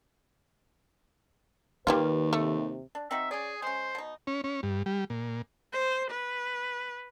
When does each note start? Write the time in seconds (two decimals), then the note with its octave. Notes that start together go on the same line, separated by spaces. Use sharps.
1.87 D#2 D#3 G3 A#3 F4 B4
2.33 C3 A3
2.95 D4
3.11 C4 D#4 F#4 E5
3.31 C#4 G#4 D5
3.62 G#3 C#4 C5
3.95 B2 D#4
4.27 C#4
4.44 C#4
4.63 G2
4.86 G3
5.10 A#2
5.73 C5
6.10 B4